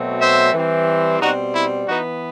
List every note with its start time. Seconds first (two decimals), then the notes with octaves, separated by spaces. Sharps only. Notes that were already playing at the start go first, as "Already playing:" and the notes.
Already playing: B2 F#3 A3 C4
0.21 C5 E5
0.54 E3 G3 C4
1.20 B2 G3 C4 D#4 F#4
1.54 E4
1.87 E3 B3 D#4 F#4